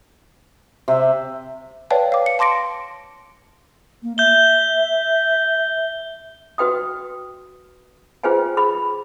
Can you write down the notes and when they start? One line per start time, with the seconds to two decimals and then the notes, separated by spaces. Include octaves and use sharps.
0.88 C3 E5
1.90 B4 C#5 D5 F5 G5 A5
2.12 F5 D6
2.26 C#7
2.39 A5 C6 D6 A#6 D7
4.03 A#3
4.18 E5 G6 G7
6.58 F#4 B4 G5 D#6
8.23 F4 G#4 B4 C5 G5 G#5
8.57 G#4 B5